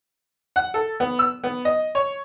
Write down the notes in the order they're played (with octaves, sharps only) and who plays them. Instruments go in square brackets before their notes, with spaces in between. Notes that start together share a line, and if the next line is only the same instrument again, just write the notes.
[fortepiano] F#5
A4
B3
E6
B3
D#5
C#5